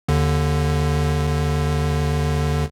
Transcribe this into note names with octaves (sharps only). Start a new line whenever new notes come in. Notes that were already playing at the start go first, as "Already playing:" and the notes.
D#2 D3